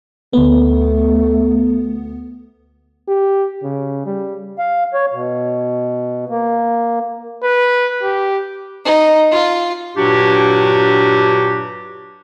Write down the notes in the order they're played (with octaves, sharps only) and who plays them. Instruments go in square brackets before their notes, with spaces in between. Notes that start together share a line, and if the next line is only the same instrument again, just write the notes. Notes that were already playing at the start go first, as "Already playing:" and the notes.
[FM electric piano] D2 B3 [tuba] A3
[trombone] G4
C#3
G3
[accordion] F5
C#5
B2
A#3
[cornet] B4
G4
[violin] D#4
F4
[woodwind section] G2 A#2 F#3 D4 F#4 G4